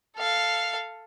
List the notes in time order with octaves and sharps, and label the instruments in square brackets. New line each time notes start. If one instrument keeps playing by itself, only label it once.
[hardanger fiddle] A4 F5